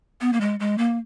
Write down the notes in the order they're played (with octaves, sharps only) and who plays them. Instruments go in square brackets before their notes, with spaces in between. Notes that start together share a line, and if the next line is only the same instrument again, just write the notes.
[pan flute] B3
A#3
G#3
G#3
A#3